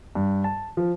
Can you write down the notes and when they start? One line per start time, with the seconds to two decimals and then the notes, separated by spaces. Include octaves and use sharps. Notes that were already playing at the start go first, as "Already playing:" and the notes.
0.15 G2
0.44 A5
0.77 F3